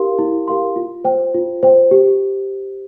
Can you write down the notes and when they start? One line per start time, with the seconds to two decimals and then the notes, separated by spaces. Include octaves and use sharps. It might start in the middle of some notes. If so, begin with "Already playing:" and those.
Already playing: E4 G4 A#4 F5 C6
0.18 E4
0.48 G4 A#4 F5 C6
0.76 F4
1.04 C5 G5
1.34 F4
1.63 C5 G5
1.91 G4